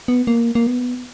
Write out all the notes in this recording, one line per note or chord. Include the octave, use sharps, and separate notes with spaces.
B3
A#3
A#3
B3